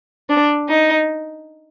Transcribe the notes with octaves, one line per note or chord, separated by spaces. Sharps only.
D4
D#4